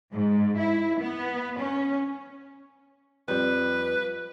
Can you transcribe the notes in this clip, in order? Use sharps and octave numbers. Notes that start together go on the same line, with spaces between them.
G#2
E4
B3
C#4
F2 G3 B4